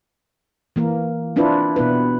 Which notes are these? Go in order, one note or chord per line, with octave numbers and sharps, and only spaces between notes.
E3 A#3 A#4
C4 D4 E4 F4 B4
B2 B3 E4 B4